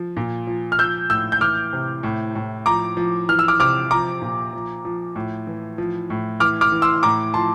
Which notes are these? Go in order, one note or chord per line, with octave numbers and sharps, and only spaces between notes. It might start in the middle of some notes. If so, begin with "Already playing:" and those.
Already playing: F3
A#2
F3
F6
F3 E6 G6
A2 E6 G6
G6
E3 D6 F6
C3
A2
A2
F3 A#5 D6
F3
E3 F6
E6
D6 F6
C3 D6 F6
F3 A#5 D6
A#2
F3
F3
A2
E3
F3
A2
E3 D6 F6
D6 F6
E3
C6 E6
A2 A#5 D6
F3 A5 C6